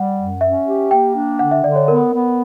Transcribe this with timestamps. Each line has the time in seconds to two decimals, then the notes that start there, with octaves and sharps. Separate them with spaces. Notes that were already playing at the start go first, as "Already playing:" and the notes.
Already playing: G3 F#5
0.17 F#2
0.41 C#4 E5
0.66 G4
0.91 A#3 G5
1.15 D4
1.39 D3 F#5
1.51 E5
1.64 D3 D5
1.76 C#5
1.88 B3 A#4
2.13 B3